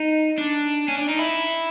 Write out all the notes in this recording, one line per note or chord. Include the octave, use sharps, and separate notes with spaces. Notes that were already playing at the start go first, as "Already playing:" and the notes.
Already playing: D#4
D4
C#4
D4
D#4
E4